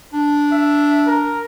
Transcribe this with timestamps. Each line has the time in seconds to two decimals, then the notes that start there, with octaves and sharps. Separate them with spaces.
0.13 D4
0.52 E5
1.07 A#4